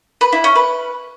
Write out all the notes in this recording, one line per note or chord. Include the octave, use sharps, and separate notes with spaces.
B4
E4
C#4
B4